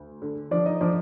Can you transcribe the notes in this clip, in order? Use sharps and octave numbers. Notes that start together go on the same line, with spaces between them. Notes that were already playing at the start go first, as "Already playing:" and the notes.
Already playing: D2
D3
F3 D4 D5
D#4 D#5
F3 D4 D5